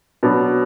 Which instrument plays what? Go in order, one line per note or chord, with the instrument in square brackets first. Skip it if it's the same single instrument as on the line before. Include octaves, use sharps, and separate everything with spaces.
[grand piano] B2 F#3 B3 D4